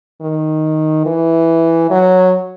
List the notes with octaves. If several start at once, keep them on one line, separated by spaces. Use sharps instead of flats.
D#3
E3
F#3